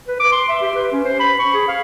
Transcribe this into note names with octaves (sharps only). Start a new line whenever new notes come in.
B4
D6
C6
E5
G4
B4
C#4
C5
B5
C#6
G#4
F5